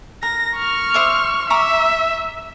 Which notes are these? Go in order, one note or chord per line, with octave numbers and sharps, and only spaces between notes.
A#4 A#6
C#6 F6
C5 E5 D6
E5 A#5 C#6 D6